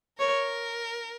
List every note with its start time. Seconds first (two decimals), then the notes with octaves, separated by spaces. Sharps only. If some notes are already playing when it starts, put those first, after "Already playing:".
0.19 A#4 C#5